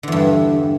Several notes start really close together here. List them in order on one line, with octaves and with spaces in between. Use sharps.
D3 E2 G2